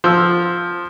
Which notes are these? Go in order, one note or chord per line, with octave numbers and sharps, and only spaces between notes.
F3 E6